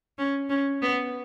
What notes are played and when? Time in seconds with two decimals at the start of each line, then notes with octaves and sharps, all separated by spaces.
0.18 C#4
0.49 C#4
0.82 B3